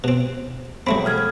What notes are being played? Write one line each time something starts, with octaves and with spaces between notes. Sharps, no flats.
B2 C4
E1 F#3 A3 C4 B5
A4 F6 G#6